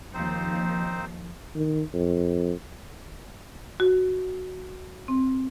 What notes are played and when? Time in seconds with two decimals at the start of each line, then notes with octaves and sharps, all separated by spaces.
0.14 D#2 F3 C4 D#4 C5
1.55 D#3
1.94 F2
3.80 F#4
5.08 C4